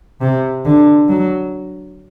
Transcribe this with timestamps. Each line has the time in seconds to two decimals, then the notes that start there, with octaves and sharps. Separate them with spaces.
0.21 C3
0.65 D3
1.09 F#3